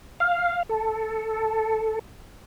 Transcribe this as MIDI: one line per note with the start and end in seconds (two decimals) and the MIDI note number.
0.20 0.63 77
0.69 1.99 69